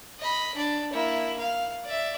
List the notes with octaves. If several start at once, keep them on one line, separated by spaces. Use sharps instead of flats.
D#5 B5
D4 D5
A#3 E4
F5
D5 E5